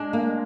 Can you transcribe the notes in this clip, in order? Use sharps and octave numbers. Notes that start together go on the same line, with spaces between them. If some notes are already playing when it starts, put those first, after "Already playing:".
Already playing: G#3 D4
A#3